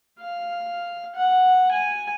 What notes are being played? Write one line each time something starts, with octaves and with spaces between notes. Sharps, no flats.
F5
F#5
G#5